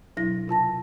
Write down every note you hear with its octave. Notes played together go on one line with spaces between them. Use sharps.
B2 F#3 D4 E4 A#6
C3 F4 A5 A#6